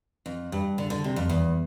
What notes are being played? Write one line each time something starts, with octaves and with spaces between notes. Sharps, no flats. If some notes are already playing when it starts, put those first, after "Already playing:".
F2
G2
D3
D3
C3
F2
E2